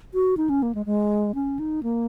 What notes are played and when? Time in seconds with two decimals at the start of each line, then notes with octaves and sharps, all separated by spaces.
0.14 F#4
0.37 D#4
0.49 C#4
0.63 A#3
0.75 G#3
0.86 G#3
1.35 C#4
1.59 D#4
1.83 A#3